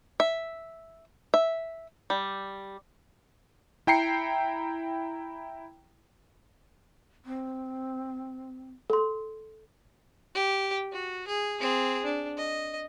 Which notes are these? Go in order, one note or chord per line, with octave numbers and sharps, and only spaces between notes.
E5
E5
G3
E4 G5 A#5 C7 C#7
C4
A4 C6
G4
F#4
G#4
C4 G#4
D4
D#5